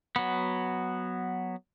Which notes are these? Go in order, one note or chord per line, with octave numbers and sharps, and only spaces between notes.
F#3 B3